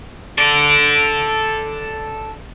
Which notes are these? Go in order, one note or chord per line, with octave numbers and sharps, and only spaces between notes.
A4 D5